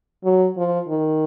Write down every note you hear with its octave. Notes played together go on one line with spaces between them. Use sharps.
F#3
F3
D#3